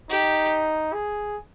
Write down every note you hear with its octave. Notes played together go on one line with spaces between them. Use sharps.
D#4 G4
G#4